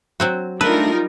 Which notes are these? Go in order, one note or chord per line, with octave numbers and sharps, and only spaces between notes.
F#3 C4 F#4
G3 A3 D4 D#4 F4 A#4 B4 E6